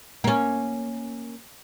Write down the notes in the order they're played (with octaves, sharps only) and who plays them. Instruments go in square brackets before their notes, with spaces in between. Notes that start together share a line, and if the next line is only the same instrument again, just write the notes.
[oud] A#3 C#4